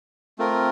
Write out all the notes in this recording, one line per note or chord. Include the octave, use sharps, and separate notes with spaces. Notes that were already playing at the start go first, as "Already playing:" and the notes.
A3 C4 F4 A#4